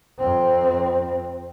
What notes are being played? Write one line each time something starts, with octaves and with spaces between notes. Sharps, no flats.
F2 C4